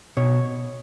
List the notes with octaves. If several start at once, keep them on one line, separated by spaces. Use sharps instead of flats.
B2 C#5